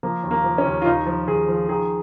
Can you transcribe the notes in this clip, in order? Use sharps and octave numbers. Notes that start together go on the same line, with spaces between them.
F3 A#3
D#2
A#3
F3
C#4
D#2
F4
D#2 D#4
F3
D#2 G#4
F3
D#3 G#4